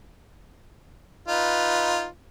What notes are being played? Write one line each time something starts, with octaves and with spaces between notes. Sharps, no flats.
D#4 F4 B4